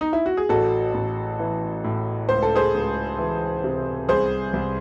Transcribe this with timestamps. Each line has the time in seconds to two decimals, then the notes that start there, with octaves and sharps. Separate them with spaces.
0.01 D#4
0.13 E4
0.26 F#4
0.37 G#4
0.49 A1 F#4 A4
0.94 A1
1.39 E3
1.84 A2
2.29 C#2 C5
2.43 A4
2.55 G#4 C5
2.74 C#2
3.18 E3
3.64 C3
4.09 C2 G#4 C5
4.53 C2